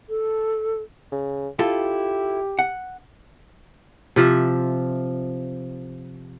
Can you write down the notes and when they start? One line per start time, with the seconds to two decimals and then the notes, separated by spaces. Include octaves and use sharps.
0.09 A4
1.12 C#3
1.59 E4 F4 G4 A4
2.59 F#5
4.16 C3 F3 E5